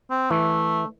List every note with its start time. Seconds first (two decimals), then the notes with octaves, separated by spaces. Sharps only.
0.10 C4
0.31 E3 A3